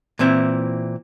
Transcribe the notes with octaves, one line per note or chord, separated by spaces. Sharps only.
A#2 E3 C4 E4